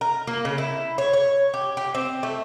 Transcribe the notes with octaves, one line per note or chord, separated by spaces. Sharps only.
A#4
A#3
C#3
E4
C#5
C#5
G4
G4
C4
A3